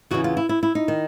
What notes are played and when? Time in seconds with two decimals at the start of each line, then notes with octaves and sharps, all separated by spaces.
0.11 E2 C#3 E3 F#4
0.24 F4
0.37 E4
0.49 E4
0.63 E4
0.75 D#4
0.88 D#3